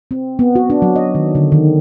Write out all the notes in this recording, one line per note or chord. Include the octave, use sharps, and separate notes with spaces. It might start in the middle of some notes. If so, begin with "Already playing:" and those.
C4
B3
F#4
D4
F#3
D#5
D#3
D3
D#3